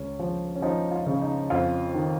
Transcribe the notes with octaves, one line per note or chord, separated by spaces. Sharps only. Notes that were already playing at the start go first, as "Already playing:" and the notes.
Already playing: C#2 C#4
F3
C#4
F3 D#4
F4
C#3
D#4
F2 F4
D#3